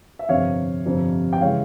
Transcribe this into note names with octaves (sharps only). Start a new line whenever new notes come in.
E5
G1 F2 C3 C#5 F5
G1 F2 C3 G3
G5
C#3 E3 G#3 C#5 F5